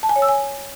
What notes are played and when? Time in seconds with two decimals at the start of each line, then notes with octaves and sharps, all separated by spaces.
0.03 A5
0.09 G#5
0.16 C#5
0.22 E6
0.28 G#5